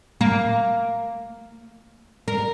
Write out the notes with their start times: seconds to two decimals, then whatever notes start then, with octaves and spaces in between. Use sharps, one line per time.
0.21 A#3
2.28 A#4